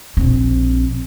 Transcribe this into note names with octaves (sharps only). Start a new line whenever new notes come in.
A#1 C4